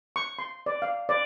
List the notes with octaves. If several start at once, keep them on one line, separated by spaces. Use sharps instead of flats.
C#6
C6
D5
F5
D5